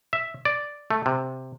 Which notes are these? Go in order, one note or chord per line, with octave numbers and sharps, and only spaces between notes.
E5
D5
A3
C3